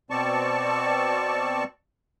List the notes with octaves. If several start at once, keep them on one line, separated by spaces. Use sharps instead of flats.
B2 C4 D5 A5 C#6